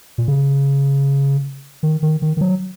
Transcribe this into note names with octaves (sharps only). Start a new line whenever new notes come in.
A#2
C#3
D#3
D#3
D#3
D#3
F#3